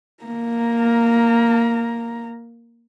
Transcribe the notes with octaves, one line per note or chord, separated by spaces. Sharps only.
A#3 A#5